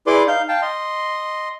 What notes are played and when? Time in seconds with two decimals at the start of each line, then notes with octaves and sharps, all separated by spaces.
0.07 E4 G#4 B4 D5 C6 D6
0.27 D#4 F5 G6
0.48 F5 G5 A5
0.62 D#5 C6